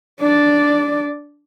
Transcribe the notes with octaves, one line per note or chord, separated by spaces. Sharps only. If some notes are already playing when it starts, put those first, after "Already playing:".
D4 D5